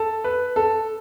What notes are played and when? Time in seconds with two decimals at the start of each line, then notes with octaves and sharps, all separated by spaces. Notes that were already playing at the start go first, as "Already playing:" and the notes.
Already playing: A4
0.24 B4
0.56 A4